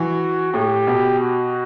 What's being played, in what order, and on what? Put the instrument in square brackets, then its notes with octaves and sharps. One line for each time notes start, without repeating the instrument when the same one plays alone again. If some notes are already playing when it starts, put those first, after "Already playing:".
Already playing: [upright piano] E3 [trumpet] F#4
[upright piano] A2 [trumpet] G4
[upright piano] B2
[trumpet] F#4